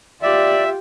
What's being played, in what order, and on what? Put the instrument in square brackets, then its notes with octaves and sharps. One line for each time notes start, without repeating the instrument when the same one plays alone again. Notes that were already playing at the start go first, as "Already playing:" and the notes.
[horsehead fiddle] F4 G4 [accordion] D5 [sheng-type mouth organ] E5